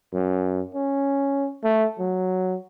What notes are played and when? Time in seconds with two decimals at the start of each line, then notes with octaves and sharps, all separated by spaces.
0.13 F#2
0.75 C#4
1.64 A3
1.99 F#3